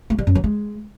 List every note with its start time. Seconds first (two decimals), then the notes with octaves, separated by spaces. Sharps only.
0.10 A3
0.18 G3
0.27 F#2
0.35 F#3
0.44 G#3